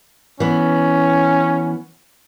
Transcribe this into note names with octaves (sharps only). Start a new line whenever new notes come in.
E3 B3 C#4